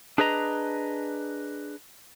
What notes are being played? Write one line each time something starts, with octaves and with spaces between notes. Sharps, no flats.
D4 G#4 B4 D#5 A#5